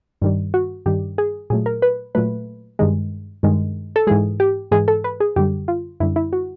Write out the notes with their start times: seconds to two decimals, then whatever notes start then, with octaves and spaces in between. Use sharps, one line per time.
0.21 G2 D#3 G3
0.54 F#4
0.86 G2 D#3 G3 G4
1.18 G#4
1.50 A#2 F#3 A3 G#4
1.66 A#4
1.82 B4
2.15 A#2 F#3 A3 B4
2.79 G2 D#3 G#3
3.43 G2 D#3 G#3
3.96 A4
4.07 G#2 E3 G#3 G#4
4.40 G4
4.71 G#2 E3 G#3 G#4
4.88 A4
5.04 B4
5.20 G#4
5.36 F#2 D3 G3 G4
5.68 F4
6.00 F#2 D3 G3 E4
6.16 E4
6.33 F#4